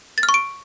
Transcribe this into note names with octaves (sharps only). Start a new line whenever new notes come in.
A6
F6
C#6
D7